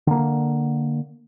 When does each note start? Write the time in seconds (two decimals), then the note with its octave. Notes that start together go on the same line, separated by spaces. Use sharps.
0.07 D3 A#3